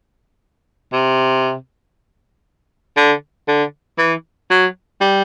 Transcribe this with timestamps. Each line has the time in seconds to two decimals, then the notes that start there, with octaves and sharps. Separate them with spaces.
0.93 C3
2.97 D3
3.48 D3
3.98 E3
4.50 F#3
5.01 G3